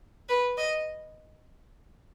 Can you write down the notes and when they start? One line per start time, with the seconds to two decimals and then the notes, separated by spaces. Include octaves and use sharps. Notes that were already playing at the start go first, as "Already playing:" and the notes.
0.29 B4
0.57 D#5